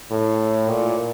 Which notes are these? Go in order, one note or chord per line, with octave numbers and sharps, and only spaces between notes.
A2
A#2